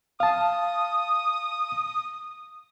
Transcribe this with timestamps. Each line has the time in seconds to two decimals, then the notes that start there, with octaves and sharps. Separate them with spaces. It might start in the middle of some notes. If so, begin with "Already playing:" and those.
0.20 F5 A5 D#6